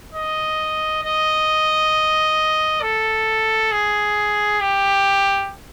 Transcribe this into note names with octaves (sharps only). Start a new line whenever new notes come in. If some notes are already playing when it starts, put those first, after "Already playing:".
D#5
D#5
A4
G#4
G4